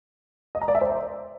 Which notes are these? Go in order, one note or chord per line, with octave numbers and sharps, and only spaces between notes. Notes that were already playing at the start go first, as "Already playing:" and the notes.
D#5
A#5
D5
E5
C5